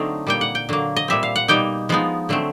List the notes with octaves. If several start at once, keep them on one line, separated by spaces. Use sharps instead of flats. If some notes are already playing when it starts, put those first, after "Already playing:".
Already playing: D3 F#3 A3 C4 D#4
A#2 G3 A#3 G5
F#5
G5
D3 F#3 A#3
D#5
A#2 G3 C4 E5
F5
F#5
B2 G3 A#3 D#4 G5
F3 G#3 B3 D#4
D3 F#3 A3 C4